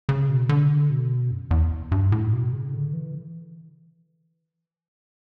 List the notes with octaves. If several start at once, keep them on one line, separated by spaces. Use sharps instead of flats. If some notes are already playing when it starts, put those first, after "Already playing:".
C#3
B2
D3
B2
F#2
E2
G2
A2
B2
C#3
D3
E3